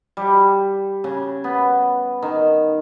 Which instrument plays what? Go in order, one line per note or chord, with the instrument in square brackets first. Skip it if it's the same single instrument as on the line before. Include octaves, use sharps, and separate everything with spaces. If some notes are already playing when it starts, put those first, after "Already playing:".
[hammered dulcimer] G3
C#3
B3
D#3